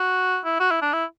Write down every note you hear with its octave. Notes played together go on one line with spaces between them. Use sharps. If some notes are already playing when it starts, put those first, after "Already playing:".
Already playing: F#4
E4
F#4
E4
D4
E4